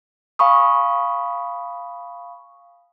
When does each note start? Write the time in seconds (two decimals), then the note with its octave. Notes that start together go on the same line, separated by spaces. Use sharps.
0.39 F5 G#5 B5 C#6 D#6